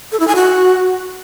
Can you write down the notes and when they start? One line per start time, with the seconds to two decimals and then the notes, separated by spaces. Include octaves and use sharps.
0.12 A4
0.20 E4
0.28 G#5
0.36 F#4